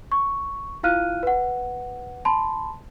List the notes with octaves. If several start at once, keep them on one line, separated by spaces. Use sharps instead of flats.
C#6
E4 F4 F5 F6 F#6 D#7
B4 F#5
A5 B5 C6